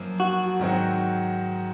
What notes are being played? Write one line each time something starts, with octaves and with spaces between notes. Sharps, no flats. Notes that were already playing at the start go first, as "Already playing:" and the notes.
Already playing: F#2 F3 A#3
F#4
G#2 D#3 F#3 C4 F#4